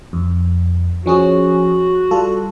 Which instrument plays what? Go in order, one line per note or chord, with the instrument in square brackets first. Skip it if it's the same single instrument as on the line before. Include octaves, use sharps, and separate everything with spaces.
[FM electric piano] F2
[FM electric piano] F3 C#4 G#4 [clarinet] F#4
[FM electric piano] G3 F4 A4